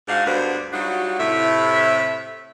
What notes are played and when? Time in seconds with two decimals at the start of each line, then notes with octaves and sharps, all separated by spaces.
0.08 G#2 D4 D#4 F#4 F5
0.25 D2 G2 B3 D4 A#4 C5
0.72 F#3 G3 D4 D#4 F4 F#4
1.19 A2 C3 E5